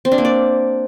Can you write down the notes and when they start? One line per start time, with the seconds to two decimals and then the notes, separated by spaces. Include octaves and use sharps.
0.05 C4
0.12 D4
0.18 A#3
0.25 D5